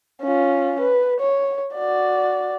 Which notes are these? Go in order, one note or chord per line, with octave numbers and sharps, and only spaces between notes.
C#4 F4
B4
C#5
F#4 D5